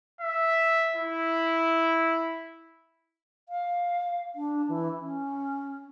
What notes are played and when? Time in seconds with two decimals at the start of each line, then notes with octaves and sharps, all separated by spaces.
0.21 E5
0.96 E4
3.49 F5
4.35 D4
4.68 E3
5.00 C#4